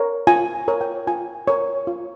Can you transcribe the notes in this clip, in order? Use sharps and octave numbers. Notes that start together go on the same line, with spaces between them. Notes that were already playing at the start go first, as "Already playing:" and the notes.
Already playing: A#4 C#5
F4 G#5
A#4 C#5
G5
F4 G#5
A#4 C#5
F4